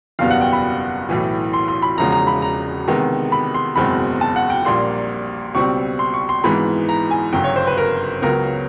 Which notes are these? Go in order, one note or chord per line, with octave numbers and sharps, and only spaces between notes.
F#1 E2 B2 G3 B3 F5
F#5
G5
B5
B1 A2 E3
C6
C6
B5
E1 E2 C#3 F3 G#3 A#5
A#5
B5
A#5
E2 C3 D#3 G#3 B3
B5
C6
F#1 E2 B2 G#3 C4 B5
A5
F#5
G5
A#1 A#2 G3 A#3 C6
C#2 B2 G3 C4 C#6
C6
C#6
C6
G#1 G#2 E3 G#3 B3 B5
A#5
G#5
G1 F#2 C#3 F#3 G5
C#5
C5
B4
A#4
C#2 C#3 F#3 B3 A#4